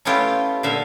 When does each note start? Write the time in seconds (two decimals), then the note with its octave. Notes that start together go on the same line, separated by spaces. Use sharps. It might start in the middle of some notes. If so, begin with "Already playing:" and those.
0.05 A3 B3 C#4 E4 F4 G4
0.63 A#2 D3 E5 F5